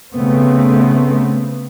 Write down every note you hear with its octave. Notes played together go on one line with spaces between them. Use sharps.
C#3 A3 B3 C4